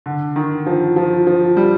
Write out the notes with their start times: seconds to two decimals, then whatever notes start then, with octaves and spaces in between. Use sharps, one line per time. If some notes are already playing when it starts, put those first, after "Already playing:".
0.06 D3
0.36 D#3
0.66 F3
0.96 F3
1.27 F3
1.57 G3